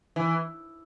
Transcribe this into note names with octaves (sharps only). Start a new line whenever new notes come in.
E3